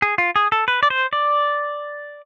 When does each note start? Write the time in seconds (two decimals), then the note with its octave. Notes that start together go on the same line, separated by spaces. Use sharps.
0.02 G#4
0.18 F4
0.36 G#4
0.52 A4
0.68 B4
0.83 D5
0.90 C5
1.13 D5